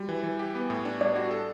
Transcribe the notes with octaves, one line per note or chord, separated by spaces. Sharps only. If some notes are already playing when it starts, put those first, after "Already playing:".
Already playing: G3 F#4
E3
E3
G4
B3
A2
D4
G3 D5
F#4
A4